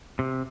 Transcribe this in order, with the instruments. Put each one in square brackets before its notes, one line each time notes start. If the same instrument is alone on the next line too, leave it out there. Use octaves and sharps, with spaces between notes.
[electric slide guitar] C3